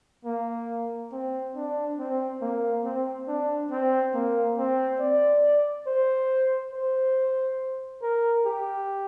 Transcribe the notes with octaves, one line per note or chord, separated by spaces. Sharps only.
A#3
C4
D4
C4
A#3
C4
D4
C4
A#3
C4
D5
C5
C5
A#4
G4